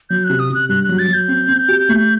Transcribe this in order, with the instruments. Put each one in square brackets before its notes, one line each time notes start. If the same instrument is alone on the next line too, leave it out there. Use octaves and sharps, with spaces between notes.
[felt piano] F#3 [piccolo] G6
[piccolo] F#6
[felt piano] C3
[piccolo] D#6
[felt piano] C3 [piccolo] F#6
[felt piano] G2 [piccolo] F#6
[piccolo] F#6
[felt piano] F#3
[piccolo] A6
[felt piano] F#3
[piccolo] G6
[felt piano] C4
C4
G4
A3